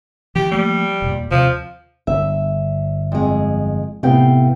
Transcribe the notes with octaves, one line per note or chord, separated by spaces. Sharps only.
E3 G4
F3 G3 A3 A#3
E1 A#2
D#2 C3 F3
G1 E5
F2 G#3
A2 C3 B3 F5 G5